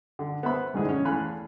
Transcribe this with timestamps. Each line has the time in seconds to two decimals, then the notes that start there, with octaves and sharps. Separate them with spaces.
0.19 D3
0.43 B3 C5 E5 B5
0.74 A#1 E2 G#2 D3 G#4
0.89 C#4
1.05 E2 A3 F5 G#5 B5 F#6